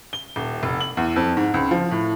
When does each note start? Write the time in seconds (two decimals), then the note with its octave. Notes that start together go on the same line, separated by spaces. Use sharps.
0.13 G7
0.36 D#1
0.63 F1
0.80 F#7
0.97 E2
1.16 F2
1.37 G#2
1.54 C#2
1.71 F3
1.91 A2